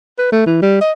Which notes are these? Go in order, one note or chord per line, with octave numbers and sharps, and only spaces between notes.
B4
A3
E3
G3
D#5